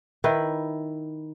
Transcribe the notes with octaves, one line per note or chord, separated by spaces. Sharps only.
D#3 E4 B4